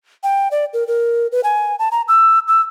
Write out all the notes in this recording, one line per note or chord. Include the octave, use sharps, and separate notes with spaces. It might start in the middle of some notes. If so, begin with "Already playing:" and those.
G5
D5
A#4
A#4
B4
G#5
A5
A#5
E6
E6